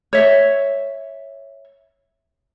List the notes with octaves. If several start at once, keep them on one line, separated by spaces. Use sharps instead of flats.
C#5 E5